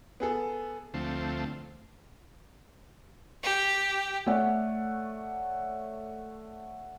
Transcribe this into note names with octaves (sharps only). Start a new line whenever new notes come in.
B3 G#4 A4
D2 F3 A3 C4
G4
A3 C#5 D5 F#5